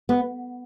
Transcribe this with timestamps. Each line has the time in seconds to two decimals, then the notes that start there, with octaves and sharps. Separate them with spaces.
0.09 B3